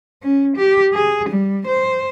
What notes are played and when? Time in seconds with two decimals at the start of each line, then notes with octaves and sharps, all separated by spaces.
0.23 C#4
0.57 G4
0.94 G#4
1.30 G3
1.67 C5